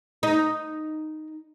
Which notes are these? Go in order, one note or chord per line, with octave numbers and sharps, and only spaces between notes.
D#4